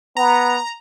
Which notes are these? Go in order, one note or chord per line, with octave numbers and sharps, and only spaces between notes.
B3 A#5